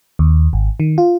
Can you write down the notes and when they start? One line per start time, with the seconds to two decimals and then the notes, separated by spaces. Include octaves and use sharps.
0.19 D#2
0.53 G#1
0.80 D#3
0.98 F4